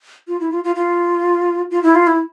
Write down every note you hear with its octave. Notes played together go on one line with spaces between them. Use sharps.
F4
E4
F4
F4
F4
F4
E4
F4
E4